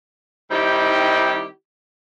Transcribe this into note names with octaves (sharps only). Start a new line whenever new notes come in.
D#3 G3 C4 D#4 E4 G4